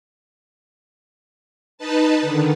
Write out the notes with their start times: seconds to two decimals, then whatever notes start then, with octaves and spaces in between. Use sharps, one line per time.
1.78 D#4 B4 A5
2.22 D3 D#3